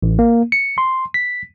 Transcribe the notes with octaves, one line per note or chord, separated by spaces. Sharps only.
A1
A#3
C#7
C6
B6